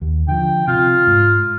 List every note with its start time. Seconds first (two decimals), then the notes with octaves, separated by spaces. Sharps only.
0.02 D#2
0.28 D3 F3 G5
0.67 C3 F4
1.07 G#2